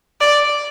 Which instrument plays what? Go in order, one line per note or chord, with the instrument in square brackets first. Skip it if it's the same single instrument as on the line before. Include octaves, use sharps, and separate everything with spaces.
[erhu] D5